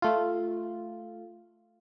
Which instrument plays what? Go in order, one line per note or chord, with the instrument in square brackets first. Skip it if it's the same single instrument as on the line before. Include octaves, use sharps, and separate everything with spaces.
[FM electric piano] A3 F4